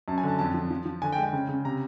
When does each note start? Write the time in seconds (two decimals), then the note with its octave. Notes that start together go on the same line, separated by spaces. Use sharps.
0.08 F#2 A5
0.18 G#5
0.24 D3 A5
0.39 F2 A5
0.54 F3
0.71 F3
0.86 F3
1.02 D3 G#5
1.12 G5
1.18 G#3
1.23 G5
1.33 C#3
1.49 C#3
1.65 C3 A#5